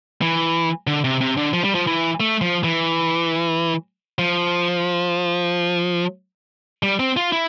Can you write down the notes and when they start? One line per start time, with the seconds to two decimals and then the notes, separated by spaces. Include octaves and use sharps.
0.22 E3
0.87 D3
1.04 C3
1.21 C3
1.37 D3
1.53 F3
1.64 G3
1.75 F3
1.87 E3
2.20 A3
2.41 F3
2.64 E3
4.19 F3
6.83 G3
7.00 C4
7.17 F4
7.32 E4